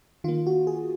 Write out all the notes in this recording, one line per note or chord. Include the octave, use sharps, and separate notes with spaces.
D#3 A#3 F4
F#4
G#4